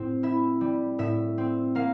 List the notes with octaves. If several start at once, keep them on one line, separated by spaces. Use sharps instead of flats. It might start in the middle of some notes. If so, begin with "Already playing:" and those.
Already playing: A2 C4
E4 E5
G3
A2 E5
C4
A#3 F5